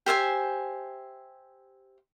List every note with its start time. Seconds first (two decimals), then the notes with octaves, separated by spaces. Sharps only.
0.06 G4 C5 E5 G#5